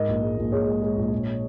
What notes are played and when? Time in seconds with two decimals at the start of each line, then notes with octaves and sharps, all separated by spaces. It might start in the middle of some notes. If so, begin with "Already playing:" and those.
Already playing: G#2 A#4 D#5
0.08 A#1
0.22 G#3
0.38 A#1
0.52 A#1 G#4 C#5
0.67 G#3
0.82 G#3
0.97 A#1
1.12 A#1